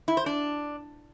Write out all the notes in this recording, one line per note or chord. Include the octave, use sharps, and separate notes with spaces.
E4
C5
D4